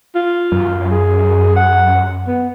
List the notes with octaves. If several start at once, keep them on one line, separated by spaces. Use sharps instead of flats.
F4
F#2
G#4
F#5
B3